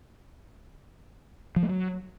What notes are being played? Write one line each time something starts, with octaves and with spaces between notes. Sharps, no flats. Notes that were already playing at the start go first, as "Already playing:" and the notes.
F3
A3
F#3